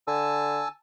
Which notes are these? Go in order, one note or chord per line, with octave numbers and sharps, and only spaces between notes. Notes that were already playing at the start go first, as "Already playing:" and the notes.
D3 G#5 A5 E6